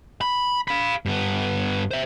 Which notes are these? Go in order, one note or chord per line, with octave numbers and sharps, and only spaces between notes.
B5
F5 B5
G2 B3
C5 E5